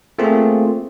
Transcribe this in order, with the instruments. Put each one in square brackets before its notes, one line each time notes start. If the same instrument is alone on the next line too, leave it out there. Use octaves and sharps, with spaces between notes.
[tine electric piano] A3 A#3 C4 F4 G#4